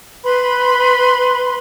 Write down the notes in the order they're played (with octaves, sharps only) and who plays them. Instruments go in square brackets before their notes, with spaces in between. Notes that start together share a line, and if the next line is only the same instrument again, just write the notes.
[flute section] B4 B5 C6